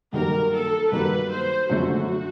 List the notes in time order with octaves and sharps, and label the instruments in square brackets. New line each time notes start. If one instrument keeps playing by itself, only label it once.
[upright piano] G2 D#3 F#3 A#3 [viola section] A#4
[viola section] A4
[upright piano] G2 D#3 F#3 A#3 [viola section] B4
[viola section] C5
[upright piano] F#2 D3 F3 A3 [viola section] F#4